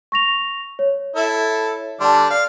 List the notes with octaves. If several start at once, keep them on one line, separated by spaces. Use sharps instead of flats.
C#6 A#6 F7
C#5
E4 A4
D3 G3 D4 A5 C6
D5 F5